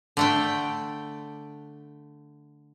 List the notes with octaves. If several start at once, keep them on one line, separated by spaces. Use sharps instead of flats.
D3 A3 G5